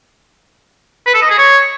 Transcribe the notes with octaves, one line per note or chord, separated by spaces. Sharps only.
B4
A4
D#5
G#4
C#5